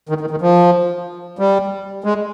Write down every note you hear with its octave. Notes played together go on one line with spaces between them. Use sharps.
D#3
D#3
D#3
F3
G3
G#3